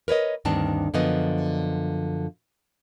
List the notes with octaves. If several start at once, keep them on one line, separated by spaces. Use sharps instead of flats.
A#4 B4 C#5 D#5
D2 G2 D#3 C4 D4 A5
F#2 D3 F3 B3 D#5